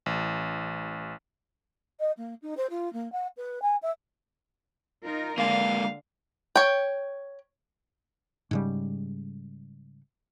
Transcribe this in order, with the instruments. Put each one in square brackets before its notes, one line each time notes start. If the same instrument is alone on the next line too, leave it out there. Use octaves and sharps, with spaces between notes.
[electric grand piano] A1
[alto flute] D#5
A#3
D#4
C5
F4
A#3
F#5
B4
G#5
E5
[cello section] D#4 F4 A#4
[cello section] D3 [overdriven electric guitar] G#3 A#3 [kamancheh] F5
[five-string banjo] C#5 G5
[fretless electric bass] G#2 C#3 G3